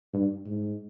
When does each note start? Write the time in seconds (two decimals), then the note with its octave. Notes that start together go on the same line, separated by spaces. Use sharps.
0.14 G2
0.45 G#2